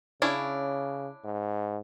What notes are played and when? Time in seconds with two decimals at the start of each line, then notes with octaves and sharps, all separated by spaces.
0.22 C#3 C#4 D4 E4
1.24 G#2